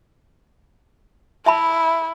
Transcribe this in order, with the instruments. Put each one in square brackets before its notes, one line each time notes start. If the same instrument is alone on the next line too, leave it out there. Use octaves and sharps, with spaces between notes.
[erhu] E4 [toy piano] E5 A5 B5